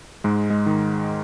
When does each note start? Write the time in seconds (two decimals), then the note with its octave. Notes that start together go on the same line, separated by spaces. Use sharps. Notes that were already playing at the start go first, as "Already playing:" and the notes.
0.24 G#2 G#3
0.50 G#3
0.66 D#3